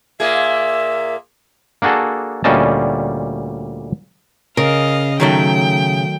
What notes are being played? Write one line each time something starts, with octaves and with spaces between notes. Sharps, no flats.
A#2 A#3 G#4 E5
A#3 D4 F#4 G#4 A4
D2 A#2 G3 C#4 D#5 A5
C#3 A#4 D#5 F5
D#3 F#3 A3 G5